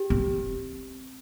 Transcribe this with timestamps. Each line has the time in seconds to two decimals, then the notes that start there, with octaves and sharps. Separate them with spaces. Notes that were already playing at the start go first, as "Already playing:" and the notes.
Already playing: G4
0.10 C4